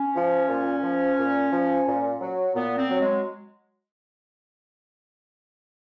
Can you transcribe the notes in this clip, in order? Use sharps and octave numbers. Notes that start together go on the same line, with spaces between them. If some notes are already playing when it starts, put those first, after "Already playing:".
Already playing: C#4
F3
A#2
F3
A#2
F3
A#2
F#3
A#2 B3
C4
F#3
G#3